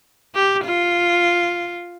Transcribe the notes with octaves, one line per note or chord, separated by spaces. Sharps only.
G4
F4